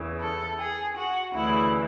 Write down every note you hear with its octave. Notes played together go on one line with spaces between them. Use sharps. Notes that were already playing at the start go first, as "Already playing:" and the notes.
Already playing: E2 C#3 E3
A4
G#4
F#4
D2 C#3 E3 E4